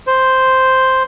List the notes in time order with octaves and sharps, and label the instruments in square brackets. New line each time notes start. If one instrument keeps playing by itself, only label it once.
[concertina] C5